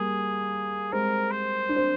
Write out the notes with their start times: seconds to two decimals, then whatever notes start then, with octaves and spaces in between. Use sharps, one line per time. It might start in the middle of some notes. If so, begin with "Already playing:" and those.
Already playing: G3 A#3 G#4
0.92 G#3 C4 A#4
1.31 C5
1.69 D4
1.76 C4